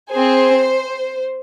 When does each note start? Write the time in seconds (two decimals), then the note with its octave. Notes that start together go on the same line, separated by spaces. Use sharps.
0.12 C4 G#4 C5